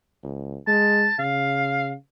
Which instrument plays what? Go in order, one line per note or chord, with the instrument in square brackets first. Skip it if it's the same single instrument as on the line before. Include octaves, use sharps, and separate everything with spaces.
[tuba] C#2
[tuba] G#3 [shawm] A5
[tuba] C#3 [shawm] F5